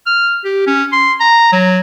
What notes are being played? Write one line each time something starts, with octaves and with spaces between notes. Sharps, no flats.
F6
G4
C#4
C6
A#5
F#3